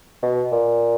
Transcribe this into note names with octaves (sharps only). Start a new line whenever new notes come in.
B2
A#2